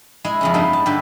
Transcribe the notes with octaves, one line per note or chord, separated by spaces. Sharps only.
G#3 E4 G#4 G#5
F2 C#3 C#4
G2 A#3 B3 D#4
A5
G2 D3 G4 E5